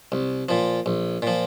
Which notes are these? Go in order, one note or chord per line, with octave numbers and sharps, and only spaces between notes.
C2
A#2 F3
A#1
A#2 F3